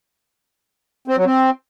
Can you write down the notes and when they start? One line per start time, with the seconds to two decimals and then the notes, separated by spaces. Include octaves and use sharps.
1.08 C4
1.17 F#3
1.26 C4